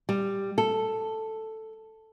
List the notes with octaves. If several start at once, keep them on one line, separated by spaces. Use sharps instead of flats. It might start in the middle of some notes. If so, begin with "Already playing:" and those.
G3
A4